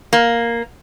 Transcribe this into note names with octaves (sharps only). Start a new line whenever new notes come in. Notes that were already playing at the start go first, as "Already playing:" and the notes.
A#3